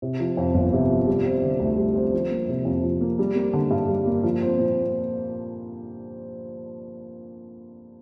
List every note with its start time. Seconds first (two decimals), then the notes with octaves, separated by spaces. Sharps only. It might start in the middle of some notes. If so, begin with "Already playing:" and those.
0.02 C3
0.20 F3
0.37 F2
0.54 G1
0.73 C3
0.90 F3
1.07 G3
1.26 C4
1.43 D3
1.60 D2
1.78 G3
1.95 C4
2.13 F3
2.30 A#3
2.48 C3
2.65 F2
2.83 F3
3.01 A#3
3.19 G3
3.35 A#3
3.53 D3
3.71 G2
3.89 G3
4.07 A#3
4.23 F3
4.42 C4
4.59 A#2